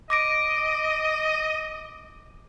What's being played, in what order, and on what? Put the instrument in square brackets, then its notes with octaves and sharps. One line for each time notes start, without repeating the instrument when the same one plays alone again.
[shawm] D#5 [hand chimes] D6 A#6 D7